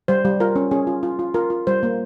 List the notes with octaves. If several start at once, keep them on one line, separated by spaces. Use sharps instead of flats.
G3 C5
G3
F4 A#4
C#4
C#4 G#4
F4
F4
F4
F4 A#4
F4
G3 C5
A#3